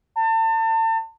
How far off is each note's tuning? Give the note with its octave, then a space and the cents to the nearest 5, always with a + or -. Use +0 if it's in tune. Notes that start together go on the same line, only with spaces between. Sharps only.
A5 +35